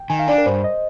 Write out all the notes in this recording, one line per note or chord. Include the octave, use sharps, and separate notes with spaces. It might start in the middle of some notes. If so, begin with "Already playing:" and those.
Already playing: G5
D#3 G#5
F5
D4 D5
A#4
G2 C5
D#5